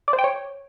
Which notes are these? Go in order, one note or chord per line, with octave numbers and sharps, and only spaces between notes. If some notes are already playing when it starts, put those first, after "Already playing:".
D5
C5
G5
C#5